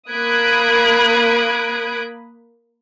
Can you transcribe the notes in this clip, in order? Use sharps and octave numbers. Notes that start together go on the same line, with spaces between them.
A#3 B5 D#6 F#6 G#6 D7